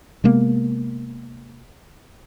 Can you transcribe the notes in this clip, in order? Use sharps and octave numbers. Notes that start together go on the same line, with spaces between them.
C3 G#3 A#3 B3